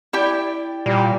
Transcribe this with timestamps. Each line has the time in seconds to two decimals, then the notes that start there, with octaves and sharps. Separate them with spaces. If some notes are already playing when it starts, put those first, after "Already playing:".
0.13 E4 G4 D5 G5
0.86 A#2 G3